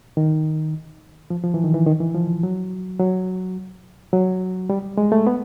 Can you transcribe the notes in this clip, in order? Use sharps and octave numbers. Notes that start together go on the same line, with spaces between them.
D#3
F3
F3
E3
D#3
E3
D#3
E3
F3
F#3
F#3
F#3
G3
G#3
A3
B3